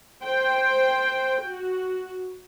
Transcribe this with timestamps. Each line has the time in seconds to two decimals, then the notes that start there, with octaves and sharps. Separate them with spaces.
0.24 C5 G5
1.44 F#4